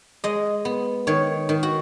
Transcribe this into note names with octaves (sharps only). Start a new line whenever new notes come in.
G#3 D#5
B3
D#3 C#5
D#3
F#4